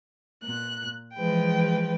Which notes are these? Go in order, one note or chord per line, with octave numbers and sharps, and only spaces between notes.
A#2 F#6
E3 F3 G#3 B4 G5